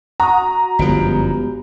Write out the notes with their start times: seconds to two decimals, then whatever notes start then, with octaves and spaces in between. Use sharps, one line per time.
0.20 F#4 A#5 D#6
0.79 G1 F#2 F3 G#3 B3 G4